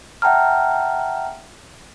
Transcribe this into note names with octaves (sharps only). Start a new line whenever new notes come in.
E5 F#5 G5 A5 A#5 F6